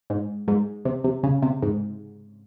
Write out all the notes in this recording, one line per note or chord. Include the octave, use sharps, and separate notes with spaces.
G#2
G#2
C3
C3
C#3
C3
G#2